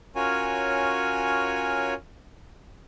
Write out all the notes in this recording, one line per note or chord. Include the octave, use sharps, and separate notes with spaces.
C#4 F4 F#4 A#4 C#5 G#5